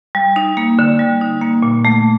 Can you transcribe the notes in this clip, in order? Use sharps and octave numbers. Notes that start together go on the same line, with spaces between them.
G3
D#4
A#3
D3
G3
D#4
A#3
A#2
A3